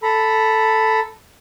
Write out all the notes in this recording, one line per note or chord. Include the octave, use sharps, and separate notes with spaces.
A4 A#5 B5